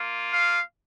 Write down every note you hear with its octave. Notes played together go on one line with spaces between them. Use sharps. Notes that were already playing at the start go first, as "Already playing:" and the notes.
Already playing: A#3 F4
F5